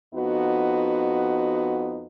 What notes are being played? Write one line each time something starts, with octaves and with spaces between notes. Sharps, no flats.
F2 B3 D#4 F#4